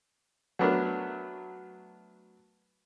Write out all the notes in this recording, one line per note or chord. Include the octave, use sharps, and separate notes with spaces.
F#3 A3 B3 D4 A#4